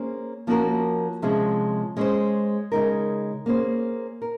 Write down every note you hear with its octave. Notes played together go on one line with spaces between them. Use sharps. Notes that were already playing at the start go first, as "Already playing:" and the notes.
Already playing: A#3 C#4 G#4 C5
F3 A#3 C#4 F#4 A#4
C3 F3 G#3 C#4 G#4
G#3 C#4 G#4 C5
C#3 G#3 D#4 A#4
A#3 C#4 G#4 C5
A#4